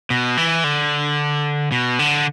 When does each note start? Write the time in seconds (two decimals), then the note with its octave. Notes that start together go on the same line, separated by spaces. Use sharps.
0.10 B2
0.37 E3
0.64 D3
1.72 B2
1.99 D3